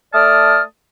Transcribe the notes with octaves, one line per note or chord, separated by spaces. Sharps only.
A3 D5 A5 D#6 F6